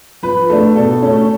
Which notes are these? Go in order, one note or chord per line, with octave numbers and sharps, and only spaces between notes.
F3 B4
A3 D4
B2 A4
A3 C#4